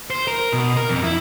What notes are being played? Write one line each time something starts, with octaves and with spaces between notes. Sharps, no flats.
C5
A#4
B2
A#4
F2
E4